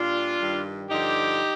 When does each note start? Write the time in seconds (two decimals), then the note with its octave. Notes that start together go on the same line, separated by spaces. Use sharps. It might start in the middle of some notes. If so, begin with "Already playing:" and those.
Already playing: A#2 G3 D4 F4
0.39 G2 D#3 G3
0.89 G2 D3 F3 D#4 G4